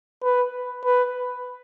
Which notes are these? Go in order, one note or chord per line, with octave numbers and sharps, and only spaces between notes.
B4
B4